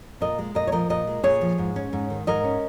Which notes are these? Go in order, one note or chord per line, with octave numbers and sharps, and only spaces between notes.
A#2 A#4 D#5
G#3
A#2 A#4 D#5
C#5
F3 A#4 D#5
A#2 A#4 D#5
G#3
A#2 G#4 C#5
F3
G#2
C#4
G#2
D#3
G#2 A#4 D#5
C#4